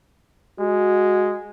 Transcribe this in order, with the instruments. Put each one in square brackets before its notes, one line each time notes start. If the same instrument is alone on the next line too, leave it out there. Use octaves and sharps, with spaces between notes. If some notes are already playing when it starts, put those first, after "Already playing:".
[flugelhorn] G#3 [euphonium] F#4